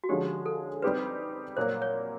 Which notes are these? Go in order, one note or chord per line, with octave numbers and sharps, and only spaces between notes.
F#4
D3 F3 G#3 C#4 G4
A4
G3 C4 D#4 G4 B4 C5
A#2 F#3 A#3 C5
C#5